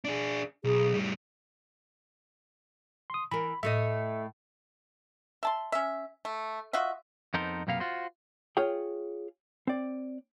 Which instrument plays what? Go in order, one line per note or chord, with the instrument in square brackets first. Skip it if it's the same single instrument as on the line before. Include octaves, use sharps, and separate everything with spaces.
[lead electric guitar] D4 G#4
[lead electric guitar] B1 [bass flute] G#4
[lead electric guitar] A2 G3
[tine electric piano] C6 D#6
[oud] E3 A#4 [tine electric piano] B5
[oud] A2 A3 D#5 [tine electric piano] E5
[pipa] E5 A5 C6
C#4 E5
A3
F4 F#4 D#5 E5
[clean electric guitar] F2 B3 D#4 A4 A#4 C5
B1 F#2 C3 A#3 B3 F5
F4 F#4 C5
[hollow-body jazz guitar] F4 G#4 C#5 G5
C4 D5